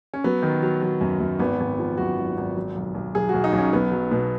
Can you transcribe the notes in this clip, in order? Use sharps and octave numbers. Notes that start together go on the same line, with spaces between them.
C#4
F#3 B3
D#3
F#3
F#3
F#2
F#2
G#1 B3
G#1
F3
F#2 F#4
G#1
G#1
F#3
B1
B1
B1 G#4
F#4
B1
D#4
B1
C#4
B1 B3
F#3
B2